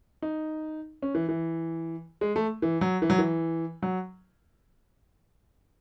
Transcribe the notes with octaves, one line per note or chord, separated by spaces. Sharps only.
D#4
C#4
E3
E3
G#3
A3
E3
F#3
E3
F#3
E3
F#3